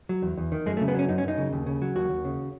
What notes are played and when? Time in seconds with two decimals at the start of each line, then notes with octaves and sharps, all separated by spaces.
0.09 F#3
0.23 E2
0.37 E2
0.52 D#3
0.66 F#2 G#3
0.77 A3
0.81 C#3
0.88 B3
0.94 F#3 C#4
1.09 F#2 D#4
1.18 C#4
1.24 F#2 D#4
1.38 C#3
1.53 D#2
1.66 C#3
1.82 F#3
1.95 D#2 F#4
2.10 D#2
2.25 C#3